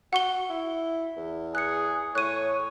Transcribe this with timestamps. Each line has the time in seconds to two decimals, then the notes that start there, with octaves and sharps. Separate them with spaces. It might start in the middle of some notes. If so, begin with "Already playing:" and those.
0.13 F#4 F#5 C#6 G7
0.50 E4
1.17 E2
1.55 G#4 F#6 C#7
2.15 A2 C#5 F#6 D#7